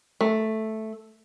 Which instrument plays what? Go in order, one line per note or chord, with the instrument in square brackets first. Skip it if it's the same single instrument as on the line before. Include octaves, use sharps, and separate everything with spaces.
[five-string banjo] A3